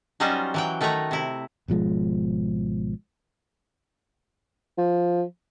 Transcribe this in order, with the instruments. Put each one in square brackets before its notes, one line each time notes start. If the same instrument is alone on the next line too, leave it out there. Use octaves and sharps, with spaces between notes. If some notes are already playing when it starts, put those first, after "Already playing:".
[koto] F#3 G3 C#4 D#4 F4 C5
E3 F#3 G5
D#3 A3 B4 C#5 A#5
C3 E4
[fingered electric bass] G#1 B2 F3 G#3
[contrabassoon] F3